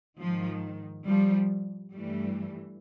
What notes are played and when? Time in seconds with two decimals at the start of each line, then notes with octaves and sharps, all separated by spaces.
0.19 G#2 D#3 F3
1.06 F3 G3
1.93 G2 E3 G3 A3